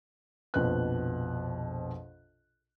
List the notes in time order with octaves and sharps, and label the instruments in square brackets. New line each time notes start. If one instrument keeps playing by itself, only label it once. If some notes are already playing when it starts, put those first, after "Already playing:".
[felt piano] A#1 F2 B2 B4 F#6